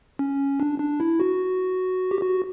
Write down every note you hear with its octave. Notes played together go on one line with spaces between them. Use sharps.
C#4
D4
D4
E4
F#4
G4
F#4